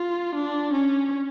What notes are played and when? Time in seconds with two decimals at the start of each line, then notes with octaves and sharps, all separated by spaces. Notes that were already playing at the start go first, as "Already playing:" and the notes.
Already playing: F4
0.35 D4
0.73 C#4